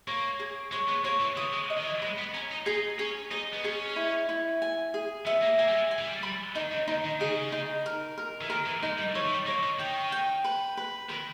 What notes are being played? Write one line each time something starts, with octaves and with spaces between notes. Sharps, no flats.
A#3 C#5
G#4
G#3 C#5
B3
A#3 C#5
E3
E3 D#6
G#3
D#5
D#3
E3
G#3 B4
B3
C#4 A#5
D#4
D#4 G#4
C#4 G#4
D#4 D#5
B3
C#4 G#4
E4
E4
G#5
G#4
B3 E5
A#3
A#3 G#5
G3
G#3
G#5
E3
G3
G3 B5
D#3 D#4
C#3
D#3 D#4
D#3
C#3 G#4
D#4
A#4
A#4
E3
D#3 A#4
E3
G#3 D#4
G3
E3 C#5
E3
G3
A#3 C#5
D#3
D#3 G5
G5
B4
B4
D#3 B4